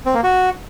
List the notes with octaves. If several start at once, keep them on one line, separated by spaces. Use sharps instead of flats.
C4
A#3
F#4